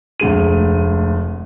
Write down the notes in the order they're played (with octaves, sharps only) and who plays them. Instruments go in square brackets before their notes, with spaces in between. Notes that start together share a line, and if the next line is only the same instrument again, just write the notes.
[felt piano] F1 D2 G#3 D#7